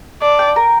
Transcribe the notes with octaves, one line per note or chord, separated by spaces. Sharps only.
D4 D5
G5
A#4